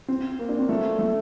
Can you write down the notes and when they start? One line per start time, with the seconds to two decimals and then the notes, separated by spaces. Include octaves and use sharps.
0.08 C4
0.39 A#3
0.49 D4
0.59 C4
0.69 A3
0.99 A3